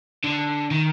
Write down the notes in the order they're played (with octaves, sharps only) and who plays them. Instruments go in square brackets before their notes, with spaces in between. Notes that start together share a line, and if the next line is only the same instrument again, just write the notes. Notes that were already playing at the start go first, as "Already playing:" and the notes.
[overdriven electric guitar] D3
D#3